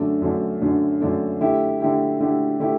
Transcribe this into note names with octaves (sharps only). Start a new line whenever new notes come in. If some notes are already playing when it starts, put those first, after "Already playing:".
Already playing: F#2 D3 A3 D4
F#2 D3 A3 D4
F#2 D3 A3 D4
F#2 D3 A3 D4
D3 A3 E4 G4
D3 A3 E4 G4
D3 A3 E4 G4
D3 A3 E4 G4